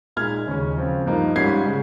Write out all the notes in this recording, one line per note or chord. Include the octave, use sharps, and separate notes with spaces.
A#2 G#3 D#4 F6 G#6
D#2 C#3 G#3 C#4
C#3 F3 C4 F4
G2 F3 A#3 D#4
G#2 G3 C#4 F4 G#6 C7
C#3 G#3